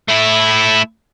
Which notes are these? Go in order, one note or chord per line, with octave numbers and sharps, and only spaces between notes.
A3 E4